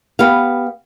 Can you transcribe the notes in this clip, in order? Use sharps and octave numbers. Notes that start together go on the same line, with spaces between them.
B3 G4 F5